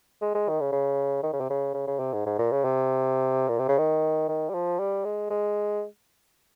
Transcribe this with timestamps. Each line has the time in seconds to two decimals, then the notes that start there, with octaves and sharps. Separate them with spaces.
0.22 G#3
0.35 G#3
0.49 D#3
0.61 C#3
0.72 C#3
1.23 D#3
1.33 C#3
1.40 C3
1.50 C#3
1.74 C#3
1.87 C#3
1.99 C3
2.13 G#2
2.26 G#2
2.38 A#2
2.52 C#3
2.64 C3
3.48 A#2
3.59 C3
3.68 C#3
3.78 D#3
4.28 D#3
4.50 G3
4.54 F3
4.79 G3
5.05 G#3
5.30 G#3